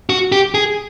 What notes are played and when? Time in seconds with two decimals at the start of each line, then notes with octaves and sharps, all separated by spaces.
0.10 F#4
0.32 G4
0.54 G#4